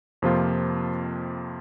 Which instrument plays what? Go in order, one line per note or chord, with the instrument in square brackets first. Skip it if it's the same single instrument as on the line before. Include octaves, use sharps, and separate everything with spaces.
[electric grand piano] F2 C3 F3 A#3 F4